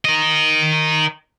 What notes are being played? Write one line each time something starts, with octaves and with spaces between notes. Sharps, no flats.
A#4 D#5